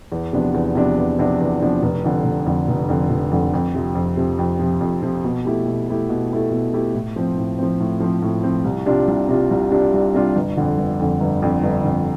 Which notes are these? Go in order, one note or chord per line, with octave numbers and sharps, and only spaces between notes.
E2
C3 F3 B3 D4
E2
C3 F3 B3 D4
E2
C3 F3 B3 D4
E2
C3 F3 B3 D4
F1
F2 D3
F1
F2 D3
F1
F2 D3
F1
F2 D3
F2
C3 F3
F2
C3 F3
F2
C3 F3
F2
C3 F3
B2
A3 E4 G4
B2
A3 E4 G4
B2
A3 E4 G4
B2
A3 E4 G4
A2
F3 C4
A2
F3 C4
A2
F3 C4
A2
F3 C4
C2
C3 G3 D4 F4
C2
C3 G3 D4 F4
C2
C3 G3 D4 F4
C2
C3 G3 D4 F4
G1
F2 D3
G1
F2 D3
G1
F2 D3
G1
F2 D3